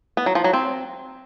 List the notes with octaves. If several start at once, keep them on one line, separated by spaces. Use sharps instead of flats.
B3
F#3
F3
F#3
C4